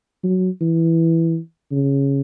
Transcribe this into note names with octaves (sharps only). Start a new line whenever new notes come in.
F#3
E3
C#3